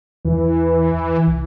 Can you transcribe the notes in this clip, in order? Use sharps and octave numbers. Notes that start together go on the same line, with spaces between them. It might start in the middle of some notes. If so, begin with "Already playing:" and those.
E2 E3
C2